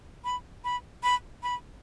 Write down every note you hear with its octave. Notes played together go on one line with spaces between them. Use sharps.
B5
B5
B5
B5